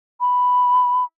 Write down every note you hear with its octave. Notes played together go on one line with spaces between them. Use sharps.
B5